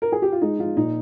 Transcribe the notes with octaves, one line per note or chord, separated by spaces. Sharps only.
A#4
G#4
G4
F4
G#3 D#4
F3 F4
A#2 D#4